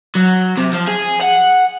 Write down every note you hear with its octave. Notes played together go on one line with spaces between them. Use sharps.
F#3
C3
F3
G#4
F#5